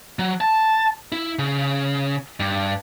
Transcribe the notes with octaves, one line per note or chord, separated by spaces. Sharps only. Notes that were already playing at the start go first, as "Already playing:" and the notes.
F#3
A5
E4
C#3
G2